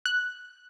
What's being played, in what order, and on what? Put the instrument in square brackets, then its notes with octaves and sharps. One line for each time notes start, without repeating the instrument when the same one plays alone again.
[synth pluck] F#6